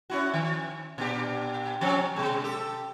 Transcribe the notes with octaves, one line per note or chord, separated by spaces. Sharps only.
C#4 E4 F#4
D#3
A#2 D4 G4
F3 C4 C#4
B2 G#3
G4 A4